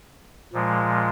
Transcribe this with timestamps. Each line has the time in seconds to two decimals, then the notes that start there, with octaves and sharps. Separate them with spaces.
0.53 A#2 F3 G#3